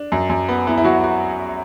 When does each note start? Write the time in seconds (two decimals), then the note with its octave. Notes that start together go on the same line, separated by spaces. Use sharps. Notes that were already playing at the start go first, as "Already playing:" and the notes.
Already playing: D4
0.12 F#2
0.29 F#2
0.48 B3
0.67 B3 E4
0.78 E4
0.84 F#3 F#4
1.04 F#4